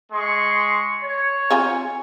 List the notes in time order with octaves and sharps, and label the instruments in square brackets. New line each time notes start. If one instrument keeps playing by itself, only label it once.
[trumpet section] G#3 C6 C#6
C#5
[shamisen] C4 F4 G#5